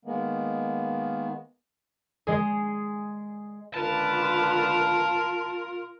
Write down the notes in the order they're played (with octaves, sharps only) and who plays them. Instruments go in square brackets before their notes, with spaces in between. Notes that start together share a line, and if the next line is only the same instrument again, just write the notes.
[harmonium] D#3 G#3 A#3 B3
[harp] G#3 G#4
[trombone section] C#2 D3 B4 [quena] F4 [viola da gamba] A#4 [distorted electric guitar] A5